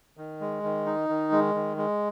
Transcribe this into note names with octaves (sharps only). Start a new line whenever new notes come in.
D#3
G#3
D#3
D#4
D#3
G#3
D#3
G#3